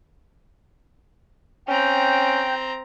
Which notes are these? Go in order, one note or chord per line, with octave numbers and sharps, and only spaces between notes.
C4 C#4 G5 A#5